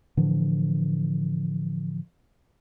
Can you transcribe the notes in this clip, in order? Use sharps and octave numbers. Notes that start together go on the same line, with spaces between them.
A2 D3 E3 F3